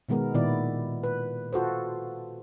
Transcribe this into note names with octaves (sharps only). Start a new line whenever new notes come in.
B2 D#3 G#3 B3 A#4
A#2 D#3 B3 E4 D5
B4
F4 F#4 A4 C5